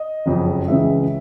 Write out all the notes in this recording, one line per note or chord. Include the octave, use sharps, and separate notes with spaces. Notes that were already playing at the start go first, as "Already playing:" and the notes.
Already playing: D#5
F#1 F2 C#3
C#2 C#3 E3 G#3 E5